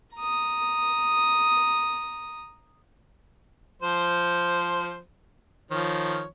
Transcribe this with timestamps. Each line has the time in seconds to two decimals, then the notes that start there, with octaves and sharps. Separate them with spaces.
0.16 A#5 D#6
3.82 F3 C5
5.71 D#3 F3 C#5